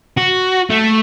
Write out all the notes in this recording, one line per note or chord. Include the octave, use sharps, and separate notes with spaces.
F#4
A3